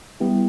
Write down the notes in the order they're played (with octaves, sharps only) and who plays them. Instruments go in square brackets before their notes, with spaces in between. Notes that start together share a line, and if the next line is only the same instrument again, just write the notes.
[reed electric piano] G3 B3 E4 G4